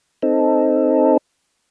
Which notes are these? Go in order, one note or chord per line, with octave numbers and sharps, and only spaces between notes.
C4 D#4 A4